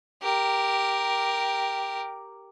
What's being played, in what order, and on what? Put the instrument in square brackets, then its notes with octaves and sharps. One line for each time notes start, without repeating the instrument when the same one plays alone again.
[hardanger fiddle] G4 A#4